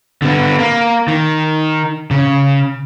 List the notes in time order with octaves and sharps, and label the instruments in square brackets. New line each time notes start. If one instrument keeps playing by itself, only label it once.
[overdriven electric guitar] D3 B3
A#3
D#3
C#3